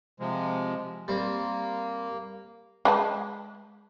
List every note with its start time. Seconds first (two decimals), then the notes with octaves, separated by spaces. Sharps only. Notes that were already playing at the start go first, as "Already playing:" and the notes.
0.20 C3 F3 G#3
1.08 G3 A#3 C4
2.85 G#3 B4 A5